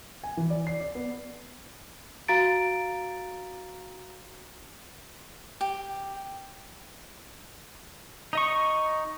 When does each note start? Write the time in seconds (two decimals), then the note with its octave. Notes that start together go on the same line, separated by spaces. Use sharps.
0.24 G#5
0.37 E3
0.50 D5
0.67 C7
0.81 D5
0.95 B3
2.28 F#4 F5 A#5 A6 D7
5.61 G4
8.33 D#4 D#5 C#6